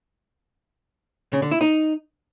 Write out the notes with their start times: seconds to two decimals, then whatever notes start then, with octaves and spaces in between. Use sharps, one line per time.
1.33 C#3
1.42 D3
1.51 E4
1.61 D#4